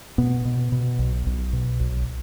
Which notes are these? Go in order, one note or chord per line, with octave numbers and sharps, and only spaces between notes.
B2 B3
B2
B2
B1
B1
B2
B1